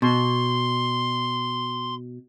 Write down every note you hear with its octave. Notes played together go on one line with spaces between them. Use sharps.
B2 C6